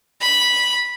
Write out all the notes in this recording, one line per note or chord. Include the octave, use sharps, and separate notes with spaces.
B5